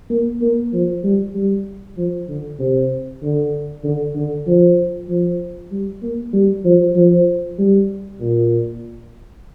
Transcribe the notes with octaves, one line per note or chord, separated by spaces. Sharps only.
A#3
A#3
F3
G3
G3
F3
D3
C3
D3
D3
D3
F3
F3
G3
A#3
G3
F3
F3
G3
A#2